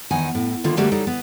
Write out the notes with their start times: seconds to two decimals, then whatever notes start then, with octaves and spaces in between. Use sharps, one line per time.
0.11 E2 D#3 D#4 F#5 G#5
0.35 A2
0.64 D3 D#3 A#3 E4 F4
0.77 D3 G3 A3 A#3 F#4
0.91 F#3 G3 D#4 A4
1.07 B3